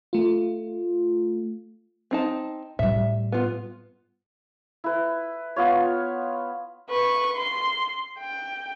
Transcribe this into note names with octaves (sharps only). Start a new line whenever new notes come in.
A3 F4
C4 D#4 A5
A2 G3 E5
B3 F4
E4 B4
B3 F4 C#5
B4 C#6
C6
G5